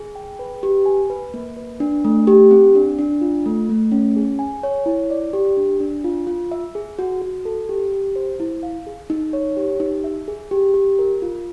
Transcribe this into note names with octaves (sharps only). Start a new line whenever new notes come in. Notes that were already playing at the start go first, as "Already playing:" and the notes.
Already playing: G#4
G5
B4
G4
G#5
B4
A#3
B4
D4
A3
G4
C4
D4
D4
F4
A3
A3
C#4
G#4
G#5
C#5
E4
D5
G4
D4
D4
F4
F4
E5
G#4
F#4
F#4
A4
G4
G4
C5
E4
F5
G#4
D#4
C#5
G4
D#4
E5
G#4
G4
G4
A#4
F4